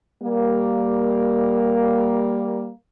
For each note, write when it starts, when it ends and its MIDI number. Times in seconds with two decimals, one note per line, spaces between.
0.22 2.70 55
0.22 2.70 58